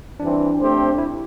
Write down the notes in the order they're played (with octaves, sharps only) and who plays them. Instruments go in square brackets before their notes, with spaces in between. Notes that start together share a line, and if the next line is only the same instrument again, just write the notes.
[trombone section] E3 G3 C4 [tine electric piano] D4
[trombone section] A3 C4 G4 C5
[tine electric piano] E4